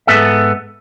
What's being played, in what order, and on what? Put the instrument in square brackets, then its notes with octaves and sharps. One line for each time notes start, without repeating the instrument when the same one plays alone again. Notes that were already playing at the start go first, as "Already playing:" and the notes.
[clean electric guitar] G#2 B3 A4 E5